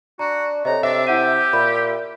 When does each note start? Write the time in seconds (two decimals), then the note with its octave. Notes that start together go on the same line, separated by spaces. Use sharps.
0.19 D4 F#4 A#5
0.65 C3 A4 C#5 D#5 A#5
0.83 C3 D4 E5
1.07 E4 G4 F#5 D#7
1.53 A#2 B5